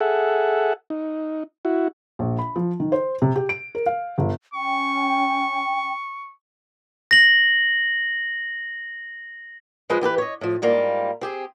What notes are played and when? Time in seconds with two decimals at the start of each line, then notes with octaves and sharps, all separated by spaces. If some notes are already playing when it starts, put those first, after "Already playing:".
0.01 G#4 A4 E5 F#5
0.90 D#4
1.65 E4 F#4
2.19 A#1
2.39 B5
2.56 F3
2.80 D#3
2.92 C5
3.22 C3
3.36 G4
3.49 D7
3.75 A#4
3.86 F5
4.18 G1
4.54 C#4 G5 C#6
7.11 A#6 F#7
9.90 F3 G#3 G#4 B4 C5 D#5
10.01 E3 G4 A4 B4
10.18 C#5 D#5
10.41 A2 F3
10.62 G#2 G3 A#3 F4
11.21 C4 G4 G#4